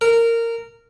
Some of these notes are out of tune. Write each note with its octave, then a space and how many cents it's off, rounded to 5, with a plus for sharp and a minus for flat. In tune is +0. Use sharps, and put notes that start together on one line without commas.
A#4 -15